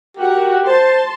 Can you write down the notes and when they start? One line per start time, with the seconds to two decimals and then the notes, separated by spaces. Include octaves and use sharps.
0.17 F#4 G4 A#4 F#5
0.67 C5 A5 C6